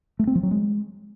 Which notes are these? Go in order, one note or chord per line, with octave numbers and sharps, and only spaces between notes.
A3
C4
F3
F#3
G#3